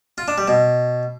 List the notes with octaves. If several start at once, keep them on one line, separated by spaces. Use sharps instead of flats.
F4
D4
G3
B2